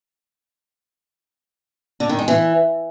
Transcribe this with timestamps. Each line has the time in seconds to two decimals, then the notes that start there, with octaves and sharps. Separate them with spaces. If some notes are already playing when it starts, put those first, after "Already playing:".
2.00 D3
2.09 D#3
2.19 G#3
2.28 E3